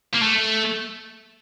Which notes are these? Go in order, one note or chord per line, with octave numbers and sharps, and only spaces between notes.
A#3
A3